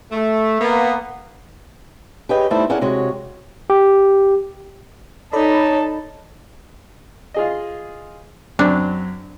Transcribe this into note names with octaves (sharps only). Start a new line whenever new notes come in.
A3
A#3 B3
G4 G#4 B4 C#5 D#5 G5
G3 A3 D#4 E4 C5
C#4 E4 G#4 A#4 D5 F#5
C3 G#3 F#4 C#5
G4
D#4 A4 C#5 D5 A5 B5
F4 G#4 D#5
F#2 F#3 C4 D4